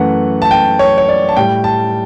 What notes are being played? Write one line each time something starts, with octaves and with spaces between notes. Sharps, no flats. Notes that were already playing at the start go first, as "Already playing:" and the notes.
Already playing: F#2 E3 A3 F#5
A5
G5
C#5
C#5
D5
A5
A2 G3 G5
A5